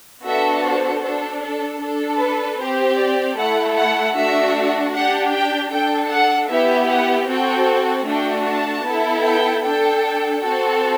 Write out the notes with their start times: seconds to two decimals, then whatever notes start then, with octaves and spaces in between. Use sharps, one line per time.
0.23 B3 D4 F#4 A4 E5
0.62 C5
1.01 D4 A4
1.41 A4
1.79 D4 A4
2.18 B4
2.58 C4 G4 C5
2.97 D5
3.36 A3 E4 A4 F#5
3.76 F#5
4.15 A3 D4 F#4 E5
4.93 D4 G4 F#5
5.32 G5
5.71 D4 A4 G5
6.10 F#5
6.49 B3 E4 G4 E5
6.89 F#5
7.28 C4 F#4 A4 G5
8.06 A3 D4 F#4 G5
8.46 A5
8.85 B3 E4 A4
9.24 G5
9.63 D4 A4 G5
10.41 C4 F#4 A4